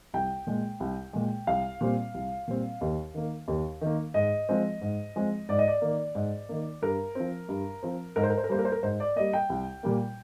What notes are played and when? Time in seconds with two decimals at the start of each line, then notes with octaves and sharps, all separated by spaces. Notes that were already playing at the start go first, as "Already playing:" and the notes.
0.14 C2 G5
0.47 A#2 G#3
0.80 C2
1.13 A#2 G#3
1.47 C2 F5
1.81 A#2 G3 C4
2.14 C2
2.47 A#2 G3 C4
2.81 D#2
3.14 D#3 A#3
3.48 D#2
3.81 D#3 A#3
4.14 G#2 D#5
4.49 F3 G#3 C4
4.81 G#2
5.16 F3 G#3 C4
5.49 G#2 D5
5.59 D#5
5.68 D5
5.81 D#3 A#3
6.15 G#2
6.49 D#3 A#3
6.82 G2 A#4
7.15 F3 C4
7.49 G2
7.83 F3 C4
8.16 G#2 A#4
8.23 C5
8.30 A#4
8.37 C5
8.44 A#4
8.49 G3 C5
8.54 A#3 A#4
8.65 C5
8.72 A#4
8.83 G#2 C5
9.00 D5
9.16 G3 A#3 D#5
9.33 G5
9.50 C2
9.83 A#2 G3 A#3